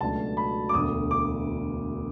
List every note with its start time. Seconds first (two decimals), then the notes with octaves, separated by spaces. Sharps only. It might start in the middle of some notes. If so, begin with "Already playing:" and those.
0.01 C#2 B2 F#3 A3 D4 A5
0.37 B5
0.69 D6
0.74 E1 D2 D3 D#6
1.11 D6